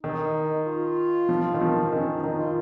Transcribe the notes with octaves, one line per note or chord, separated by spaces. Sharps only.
D#3 D#4
F4
F3
D#3
F3
D#3 C#4
D#4
D#3 D#4
F4